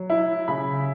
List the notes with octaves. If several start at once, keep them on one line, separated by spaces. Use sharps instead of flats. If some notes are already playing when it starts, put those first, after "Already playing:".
Already playing: F#3
E4
C#3 B5